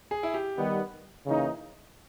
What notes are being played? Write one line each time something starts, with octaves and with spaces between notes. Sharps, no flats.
G#4
E4
G4
D#3 G3 B3
C#3 E3 A#3 D#4